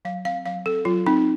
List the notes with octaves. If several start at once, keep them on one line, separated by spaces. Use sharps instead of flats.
F#3 F5
C4 F5
F#3 F5
C4 A4
F#3 F4
C4 D#4